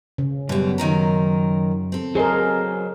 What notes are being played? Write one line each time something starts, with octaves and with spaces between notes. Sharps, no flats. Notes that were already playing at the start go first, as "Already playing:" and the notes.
C#3
F#2 B2 G3
D#3 F#3 A#4
C4 A4
F#3 G#4 A#4 C5 D#5